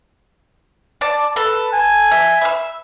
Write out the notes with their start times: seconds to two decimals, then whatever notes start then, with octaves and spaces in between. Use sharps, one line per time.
1.01 D5 A5
1.36 A4 B4
1.73 G#5
2.11 E5
2.41 E5 B5 E6